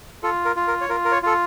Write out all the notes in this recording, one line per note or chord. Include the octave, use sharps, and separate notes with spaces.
F4 A4
A#4
F4
A#4
C#5
F4 A#4
A#4
C#5
F4 A4